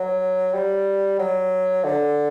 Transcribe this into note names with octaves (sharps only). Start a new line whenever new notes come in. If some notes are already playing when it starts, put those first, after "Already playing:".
Already playing: F#3
G3
F#3
D3